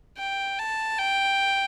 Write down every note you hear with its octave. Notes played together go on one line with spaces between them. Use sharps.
G5
A5
G5